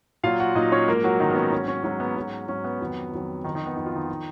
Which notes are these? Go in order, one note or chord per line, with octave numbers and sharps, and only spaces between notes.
A#2 F#3 F4 F5
F#4 F#5
A#2 F#3 D#4 D#5
C#4 C#5
G#2 F3 A#3 A#4
F#3 F#4
G#2 D#3 F3 D#4
B3
C#4
G#2 F#3 C#4
C#4
G#2 F#3 C#4
B3
G#2 F#3 C#4
G#2 F#3 C#4
B3
F2 D#3 F#3
F2 D#3 F#3
F2 D#3 F3 D#4
D#3 D#4
B3
F2 F3 D#4
F4
D#3 D#4
F3